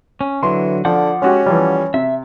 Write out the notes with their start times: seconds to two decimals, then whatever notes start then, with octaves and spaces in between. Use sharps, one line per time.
0.21 C#4
0.43 D3 E3 F#3 C6
0.85 D3 F3 F#5 D6 G6
1.22 G#3 C#4 F#4 G4
1.46 E3 F3 G3
1.94 C3 E5